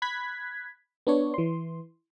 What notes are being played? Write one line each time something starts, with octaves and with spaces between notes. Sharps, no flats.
B5 F#6 G#6 B6
B3 D4 C#5
E3 C6